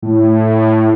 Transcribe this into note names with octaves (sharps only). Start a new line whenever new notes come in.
A2